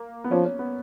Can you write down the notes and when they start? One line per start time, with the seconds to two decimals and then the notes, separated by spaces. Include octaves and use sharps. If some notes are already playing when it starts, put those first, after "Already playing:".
Already playing: A#3
0.24 B3
0.31 F3 C#4
0.45 C#4
0.59 B3